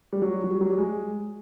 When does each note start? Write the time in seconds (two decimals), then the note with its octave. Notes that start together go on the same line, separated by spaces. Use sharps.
0.13 G3
0.22 F#3
0.44 F#3
0.50 G3
0.61 F#3
0.70 G3
0.78 G#3